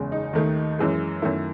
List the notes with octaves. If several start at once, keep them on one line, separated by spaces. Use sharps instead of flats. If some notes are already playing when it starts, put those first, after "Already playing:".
Already playing: F#1 E2 C#3 G#3
D#4
D#2 D#3 A3
F#2 E3 G#3
F#2 D#3 A3 E4